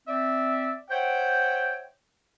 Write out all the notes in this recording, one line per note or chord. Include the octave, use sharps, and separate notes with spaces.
C4 D5 E5
C5 C#5 E5 F#5 G5